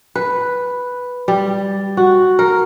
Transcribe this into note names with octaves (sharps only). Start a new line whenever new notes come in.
B4
G3
F#4
A#4